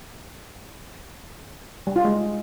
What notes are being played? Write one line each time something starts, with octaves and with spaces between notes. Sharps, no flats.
G3
F4
G#3